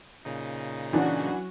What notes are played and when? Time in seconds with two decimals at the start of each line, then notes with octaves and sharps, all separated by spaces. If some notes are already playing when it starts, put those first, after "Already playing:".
0.25 A#2 C#3 D#4
0.93 E3 F#3 C#4 D4 F#4